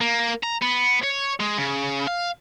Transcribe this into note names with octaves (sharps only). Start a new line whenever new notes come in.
A#3
A#5
B3
C#5
G#3
C#3
F5